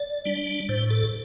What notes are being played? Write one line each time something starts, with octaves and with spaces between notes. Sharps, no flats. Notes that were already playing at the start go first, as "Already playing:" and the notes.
Already playing: D5
G3 D4
A2 C5
A4